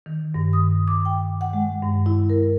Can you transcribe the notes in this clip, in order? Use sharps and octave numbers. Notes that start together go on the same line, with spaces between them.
D#3
G2
D#6
D6
G5
F#5
G#3
G2
E4
A#4